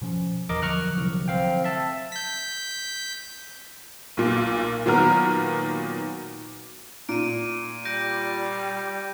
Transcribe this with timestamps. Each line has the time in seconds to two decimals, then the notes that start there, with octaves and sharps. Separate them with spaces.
0.01 B2 F3 C#4
0.49 E2 E3 A#4 D#5 D6
0.62 D3 F3 F#3 C#6 F6 F#6
0.97 C2
1.28 C4 F5 G5
1.64 E5 A5
2.12 G6 B6
4.17 B1 A#2
4.86 A#2 D#3 F#3 B3 A#4 F6
7.09 A#2 D7 D#7
7.85 G3 G6 A#6 D7